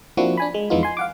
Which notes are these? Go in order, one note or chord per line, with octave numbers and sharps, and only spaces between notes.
F3 A#3 C4 D4 E4 F#4
D4 G#5 B5
G#3
F2 E3 G#3 B3 D#4 F4
G#5 C6
F5 F#5 D6